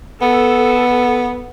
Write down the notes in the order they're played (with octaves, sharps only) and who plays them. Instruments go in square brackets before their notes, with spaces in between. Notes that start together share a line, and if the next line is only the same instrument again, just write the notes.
[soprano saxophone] B3 [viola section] A4